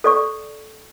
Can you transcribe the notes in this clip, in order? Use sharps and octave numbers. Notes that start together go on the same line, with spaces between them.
A4 D5 C#6